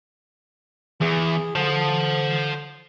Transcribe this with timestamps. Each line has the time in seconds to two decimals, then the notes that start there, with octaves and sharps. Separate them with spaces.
1.01 E2 G#4
1.55 D3 C5 A5